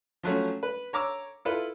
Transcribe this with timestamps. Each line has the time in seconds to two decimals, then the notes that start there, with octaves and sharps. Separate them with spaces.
0.23 F3 F#3 A3 C#4
0.63 B4
0.93 C#5 A#5 D6 E6
1.45 E4 F4 A4 B4